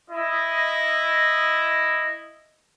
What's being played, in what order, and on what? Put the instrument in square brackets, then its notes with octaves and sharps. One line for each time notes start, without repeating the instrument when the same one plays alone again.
[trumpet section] E4 D#5